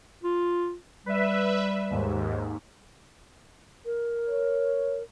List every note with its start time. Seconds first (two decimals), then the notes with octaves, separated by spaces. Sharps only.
0.23 F4
1.06 G3 B4 E5
1.90 D#2 G#2
3.85 A#4
4.28 C#5